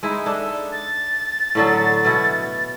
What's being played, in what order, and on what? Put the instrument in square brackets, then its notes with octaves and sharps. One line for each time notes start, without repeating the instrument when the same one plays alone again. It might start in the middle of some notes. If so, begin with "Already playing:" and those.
[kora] G#3 D#4 E4
D4 A4
[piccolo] A6
[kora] A2 D3 F#3
B2 E4 F#4